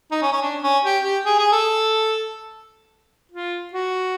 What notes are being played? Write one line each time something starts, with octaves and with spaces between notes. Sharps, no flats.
D#4
C#4
C#4
D4
C#4
G4
G4
G#4
G#4
A4
F4
F#4